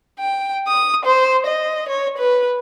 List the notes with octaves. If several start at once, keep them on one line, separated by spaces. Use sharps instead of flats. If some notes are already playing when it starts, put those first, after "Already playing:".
G5
D#6
C5
D#5
C#5
B4